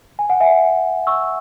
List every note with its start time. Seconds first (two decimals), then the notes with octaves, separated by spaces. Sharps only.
0.19 G#5
0.30 F#5
0.40 E5 G#5
1.07 C#6 E6